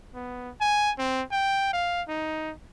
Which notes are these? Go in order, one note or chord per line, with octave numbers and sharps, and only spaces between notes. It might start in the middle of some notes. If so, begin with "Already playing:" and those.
B3
G#5
C4
G5
F5
D#4